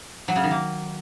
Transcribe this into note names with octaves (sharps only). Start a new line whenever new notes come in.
F#3
C#3
D#3
A#3